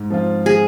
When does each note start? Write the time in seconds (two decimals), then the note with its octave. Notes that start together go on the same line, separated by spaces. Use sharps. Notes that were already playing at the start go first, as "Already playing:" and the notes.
Already playing: G#2
0.10 F3 C4 F4
0.46 G#4